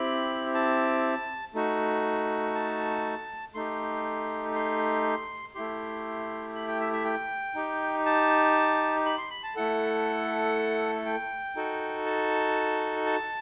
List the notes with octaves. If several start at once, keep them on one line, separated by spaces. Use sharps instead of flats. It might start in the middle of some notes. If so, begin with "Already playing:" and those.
Already playing: C4 E4 G4 B5
A5
A3 D#4 F#4
A5
A3 D#4 G4 C6
C6
A3 E4 G4 C6
B5
G5
E5
E5
G5
D#4 G4
A5
B5
C6
B5
A5
A3 E4 A4 F#5
G5
D#4 F#4 A4
A5
A5